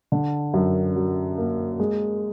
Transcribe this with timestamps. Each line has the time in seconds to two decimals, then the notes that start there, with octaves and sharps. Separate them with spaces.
0.12 D3
0.54 F#2
0.96 F#3
1.38 A#3
1.80 G#3